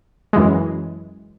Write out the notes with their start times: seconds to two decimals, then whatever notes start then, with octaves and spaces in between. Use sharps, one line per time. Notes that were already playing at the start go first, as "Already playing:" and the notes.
0.33 F#2 E3 G#3